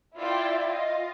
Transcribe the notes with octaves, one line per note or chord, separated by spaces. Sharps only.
E4 F4 D5 E5 G5
F4 D#5